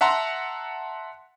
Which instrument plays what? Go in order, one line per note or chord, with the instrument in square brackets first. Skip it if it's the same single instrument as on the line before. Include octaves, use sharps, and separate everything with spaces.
[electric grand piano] E5 F#5 A5 A#5 C6